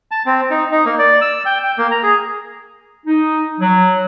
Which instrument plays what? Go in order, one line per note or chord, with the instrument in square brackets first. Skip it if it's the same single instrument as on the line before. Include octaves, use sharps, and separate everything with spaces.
[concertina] A5
C4
D#4
D#4
A#3
D5
E6
G5
G5
A#3
A#5
G#4
[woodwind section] D#4
F#3